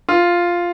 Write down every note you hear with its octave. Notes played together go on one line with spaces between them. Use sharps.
F4